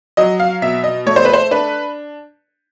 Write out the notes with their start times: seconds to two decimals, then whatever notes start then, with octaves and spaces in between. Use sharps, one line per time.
0.17 F#3 D#5
0.40 F5
0.62 B2 E5
0.84 D#5
1.06 A3 C#5
1.16 C5
1.25 B4
1.34 C5
1.51 D4 B4